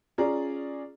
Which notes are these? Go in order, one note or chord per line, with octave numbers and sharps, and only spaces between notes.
C#4 F4 G#4 D5 A#5